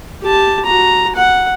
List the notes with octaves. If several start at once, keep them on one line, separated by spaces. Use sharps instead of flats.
G4 A5
F#4 A#5
F#5